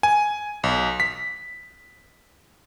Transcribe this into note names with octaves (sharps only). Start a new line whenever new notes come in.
G#5
B1
B6